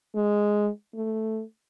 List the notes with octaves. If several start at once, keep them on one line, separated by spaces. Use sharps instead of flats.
G#3
A3